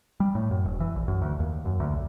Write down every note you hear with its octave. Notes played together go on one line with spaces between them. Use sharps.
G3
A2
F#2
E1
E3
A#1
F#2
D2
D#2
F#2
D2
B1